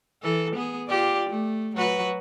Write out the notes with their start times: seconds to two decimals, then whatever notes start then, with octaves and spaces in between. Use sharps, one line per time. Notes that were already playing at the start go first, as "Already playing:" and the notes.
0.22 E3 A4
0.55 B3 G#4
0.88 F4 G4 D5
1.29 A3
1.76 F#3 F#4 B4